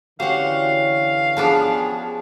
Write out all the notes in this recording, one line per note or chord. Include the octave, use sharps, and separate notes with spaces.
D3 E3 C#4 F#4 G4 C5 F5 F#5
F3 B3 D4 G#4